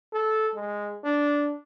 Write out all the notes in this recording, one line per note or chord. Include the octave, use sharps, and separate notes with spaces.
A4
G#3
D4